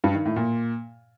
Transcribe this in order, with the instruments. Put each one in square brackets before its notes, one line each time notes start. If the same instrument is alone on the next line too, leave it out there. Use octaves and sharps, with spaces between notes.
[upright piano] G2
D#3
A2
A#2